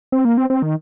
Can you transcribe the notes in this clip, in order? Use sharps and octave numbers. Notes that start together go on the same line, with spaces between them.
C4
A#3
C4
C4
D#3